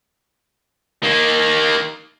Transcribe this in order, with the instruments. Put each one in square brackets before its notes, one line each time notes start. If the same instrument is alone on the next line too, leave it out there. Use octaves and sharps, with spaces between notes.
[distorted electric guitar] D#3 A#3